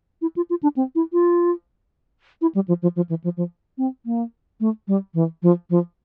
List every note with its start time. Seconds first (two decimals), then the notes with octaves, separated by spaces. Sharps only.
0.22 E4
0.36 F4
0.50 F4
0.63 D4
0.77 C4
0.95 E4
1.13 F4
2.41 E4
2.55 G3
2.68 F3
2.82 F3
2.96 F3
3.09 E3
3.24 F3
3.37 F3
3.78 C4
4.06 A#3
4.60 A3
4.88 G3
5.14 E3
5.43 F3
5.70 F3